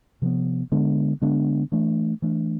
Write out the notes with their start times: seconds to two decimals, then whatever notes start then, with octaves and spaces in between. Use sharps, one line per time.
0.22 C3 F3 B3
0.72 D3 G#3 B3 D4
1.21 D3 G#3 B3 D4
1.72 E3 A3 D4
2.22 E3 A3 D4